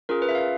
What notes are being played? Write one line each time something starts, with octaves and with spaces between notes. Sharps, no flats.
C#4 F4 G#4 A#4
B4
E5
F5